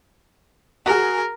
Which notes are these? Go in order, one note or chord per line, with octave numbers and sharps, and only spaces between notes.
F#4 G#4 A#4